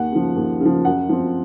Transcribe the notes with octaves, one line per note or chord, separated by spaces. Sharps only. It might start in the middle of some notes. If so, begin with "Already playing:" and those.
Already playing: D#2 F#5
C#3 F3
D#2
C#3
F3
F#2 F#5
F3 C4